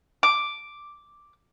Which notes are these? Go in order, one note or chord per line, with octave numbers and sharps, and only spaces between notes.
D6